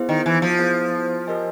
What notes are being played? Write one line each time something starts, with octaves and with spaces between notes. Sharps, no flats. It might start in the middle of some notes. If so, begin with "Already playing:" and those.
Already playing: B3 E4 G#4 C5
D#3
E3
F3
B3 E4 G#4 C5
G4 A#4 D#5 G#5